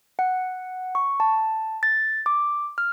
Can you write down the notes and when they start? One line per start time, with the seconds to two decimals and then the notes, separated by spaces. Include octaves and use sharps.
0.19 F#5
0.95 C#6
1.20 A5
1.83 A6
2.26 D6
2.78 F6